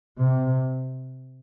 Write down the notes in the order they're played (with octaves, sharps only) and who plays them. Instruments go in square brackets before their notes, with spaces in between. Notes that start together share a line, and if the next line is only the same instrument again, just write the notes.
[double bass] C3